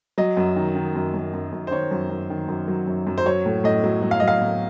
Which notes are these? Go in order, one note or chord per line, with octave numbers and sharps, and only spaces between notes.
F#3 D#5
F#2
D#3
D#3
F#2
F#2
F#2
F#2
C5
D#3 C#5
F#2
F#2
D#3
F#2
F#3
F#2
F#2
C5
F#3 C#5
A2
A2 D#5
F#3
F#3
F5
F#3 D#5
F5
A2